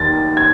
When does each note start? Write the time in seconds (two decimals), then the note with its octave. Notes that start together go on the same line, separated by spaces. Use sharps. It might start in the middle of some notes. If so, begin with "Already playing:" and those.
Already playing: D#2 A6
0.37 G#6